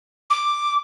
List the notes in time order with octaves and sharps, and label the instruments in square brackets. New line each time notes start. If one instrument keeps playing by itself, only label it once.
[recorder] D6